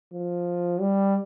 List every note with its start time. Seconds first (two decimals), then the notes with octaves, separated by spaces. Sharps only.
0.13 F3
0.81 G3